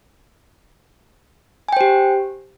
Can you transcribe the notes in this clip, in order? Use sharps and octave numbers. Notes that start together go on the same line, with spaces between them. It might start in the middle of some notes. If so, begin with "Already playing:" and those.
G4 C5 G5 G#5